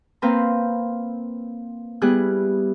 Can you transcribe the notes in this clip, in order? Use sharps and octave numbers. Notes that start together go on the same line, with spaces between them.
A#3 C4 B4 F5 G5 A#5
G3 B3 E4 G#4 F#6